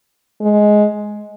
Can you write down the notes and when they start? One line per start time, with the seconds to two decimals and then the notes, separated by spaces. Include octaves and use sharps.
0.41 G#3